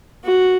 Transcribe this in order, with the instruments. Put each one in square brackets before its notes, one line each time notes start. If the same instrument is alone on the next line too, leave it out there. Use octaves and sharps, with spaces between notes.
[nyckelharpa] F#4